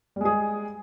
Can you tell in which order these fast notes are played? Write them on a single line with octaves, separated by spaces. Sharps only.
G3 G#3 G#4